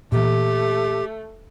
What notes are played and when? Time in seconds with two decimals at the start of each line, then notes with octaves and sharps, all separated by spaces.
0.12 A#2 E3 A3 G4